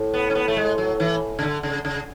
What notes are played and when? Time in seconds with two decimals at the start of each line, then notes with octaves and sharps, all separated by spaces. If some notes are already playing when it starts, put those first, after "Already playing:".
Already playing: A2
0.14 B3
0.30 C#4
0.35 B3
0.48 A3
0.57 G#3
0.78 F#3
1.00 E3
1.39 C#3
1.42 D3
1.63 C#3
1.85 C#3